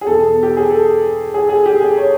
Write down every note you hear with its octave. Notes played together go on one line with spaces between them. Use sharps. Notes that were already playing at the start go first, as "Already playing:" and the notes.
G#4
E2 B2 A4
G4
G#4
A4
G#4
G#4
G4
G#4
C#5